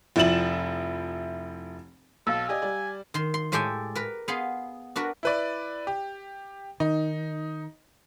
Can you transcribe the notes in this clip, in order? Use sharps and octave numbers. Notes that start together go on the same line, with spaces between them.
F1 F3 E4 A6 E7 F#7
B1 A4 F5 E6
G4 D5 D#5 G#5
G3 D5
D#3 C6
C6
A2 G#3 G4 A4 G5 G#5
A#4 B4
B3 G#4 F5 C6
D4 F#4 A#4 B4
E4 B4 D5
G4
D#3 D#4